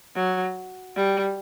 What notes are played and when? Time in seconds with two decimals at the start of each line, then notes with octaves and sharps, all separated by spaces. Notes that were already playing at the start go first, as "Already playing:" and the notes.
0.16 F#3
0.96 G3